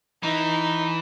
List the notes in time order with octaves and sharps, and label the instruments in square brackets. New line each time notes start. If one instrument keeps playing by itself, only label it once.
[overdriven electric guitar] E3 [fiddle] D#4